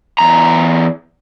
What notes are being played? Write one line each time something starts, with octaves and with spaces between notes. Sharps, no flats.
E2 A#5